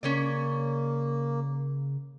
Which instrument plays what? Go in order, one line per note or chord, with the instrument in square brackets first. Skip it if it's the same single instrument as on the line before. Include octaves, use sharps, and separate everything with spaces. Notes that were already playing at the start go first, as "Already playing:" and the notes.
[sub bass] C#3 [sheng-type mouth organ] A#3 [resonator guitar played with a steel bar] C#4 C#5 D5